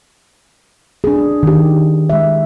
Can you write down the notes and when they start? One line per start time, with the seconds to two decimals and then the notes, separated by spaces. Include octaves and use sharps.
1.04 D4 G#4
1.43 D#3 G4
2.10 G#3 E5